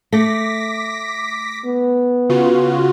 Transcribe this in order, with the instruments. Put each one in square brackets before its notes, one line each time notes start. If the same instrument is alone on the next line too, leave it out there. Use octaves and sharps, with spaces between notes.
[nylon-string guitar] A3 [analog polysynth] D6 A#6 B6
[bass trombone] B3
[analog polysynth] C#3 F4 F#4